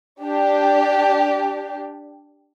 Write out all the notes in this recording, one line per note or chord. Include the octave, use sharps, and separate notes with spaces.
D4 G4